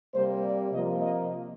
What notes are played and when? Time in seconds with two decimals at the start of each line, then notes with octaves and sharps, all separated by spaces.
0.14 C3 G3 A#3 C5
0.43 D5
0.71 C3 F3 A#3 D#5
1.00 D#5